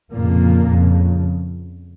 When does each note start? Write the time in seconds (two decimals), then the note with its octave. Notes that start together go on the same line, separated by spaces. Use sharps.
0.13 F2 A#2 C#3 A#3
0.69 F2 C#3